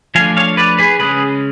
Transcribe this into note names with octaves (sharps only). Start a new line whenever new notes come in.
F3 A3 D4 F5 G#5
C#5 F5
B4 D5
G#4 B4
C#3 G#3 C#4 G#4 B4